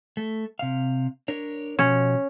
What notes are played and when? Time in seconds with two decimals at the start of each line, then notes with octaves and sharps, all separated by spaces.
0.17 A3
0.59 C3 F5
1.28 D4 A#4 C#5
1.79 B2 F3 C#4